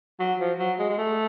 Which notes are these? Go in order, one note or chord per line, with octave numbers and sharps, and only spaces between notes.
F#3
F3
F#3
G#3
G#3
A3